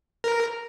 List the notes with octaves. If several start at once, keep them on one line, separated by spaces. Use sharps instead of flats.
A#4